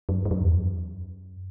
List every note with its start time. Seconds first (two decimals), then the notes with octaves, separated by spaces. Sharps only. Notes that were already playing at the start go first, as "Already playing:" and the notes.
0.09 F#2
0.25 G2
0.31 F#2
0.42 E2
0.54 F#2